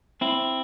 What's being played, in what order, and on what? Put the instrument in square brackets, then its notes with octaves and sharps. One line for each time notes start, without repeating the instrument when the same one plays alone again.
[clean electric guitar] C4 E4